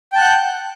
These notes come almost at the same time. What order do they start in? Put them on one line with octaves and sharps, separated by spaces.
G5 A5 F#6 F#5 G6